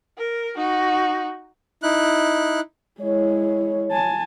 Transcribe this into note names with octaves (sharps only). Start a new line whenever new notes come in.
A#4
D#4 F#4
D#4 E4 F#6
G#3 E4 C#5
G#5 A5